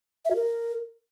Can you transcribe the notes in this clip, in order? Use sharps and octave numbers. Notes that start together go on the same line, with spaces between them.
E5
F#4
A#4